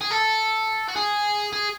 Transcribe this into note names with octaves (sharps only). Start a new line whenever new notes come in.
G#4
A4
F#4
G#4
G#4